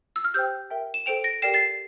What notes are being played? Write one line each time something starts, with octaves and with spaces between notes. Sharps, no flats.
E6
F6
G4 C5 G5 E6 G6
A#4 E5 G5
E7
A4 C5 G5 D7 F7
A#6 D7
G4 A#4 D5 G5 C7 E7
A6 C7